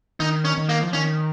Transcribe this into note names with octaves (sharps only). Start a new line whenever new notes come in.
D#3 D#4
C#4
D#3
A#3
F3
D#3 C#4